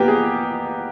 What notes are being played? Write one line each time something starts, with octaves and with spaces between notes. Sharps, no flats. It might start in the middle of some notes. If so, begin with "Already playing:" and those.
Already playing: A#3 B3 G4
G#4